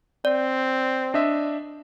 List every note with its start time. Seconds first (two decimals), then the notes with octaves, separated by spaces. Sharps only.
0.25 C4 D5
1.14 D4 D#5 E5